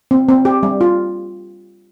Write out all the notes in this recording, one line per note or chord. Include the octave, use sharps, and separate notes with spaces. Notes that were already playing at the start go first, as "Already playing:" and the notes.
C4
C4
G4
G3
F4